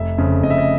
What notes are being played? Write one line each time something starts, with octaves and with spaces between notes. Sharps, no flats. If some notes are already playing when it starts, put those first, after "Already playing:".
Already playing: F1 E5
F2 C#3
F1 D#5
E5
D#5